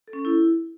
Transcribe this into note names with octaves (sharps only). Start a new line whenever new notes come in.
A4
C#4
A4
E4